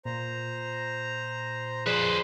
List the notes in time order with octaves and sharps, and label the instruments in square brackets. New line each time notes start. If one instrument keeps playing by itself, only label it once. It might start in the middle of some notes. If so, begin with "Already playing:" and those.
[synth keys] A#2 [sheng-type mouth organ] C5 A#5
[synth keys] F3 G#4 D5 [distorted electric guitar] B4 C5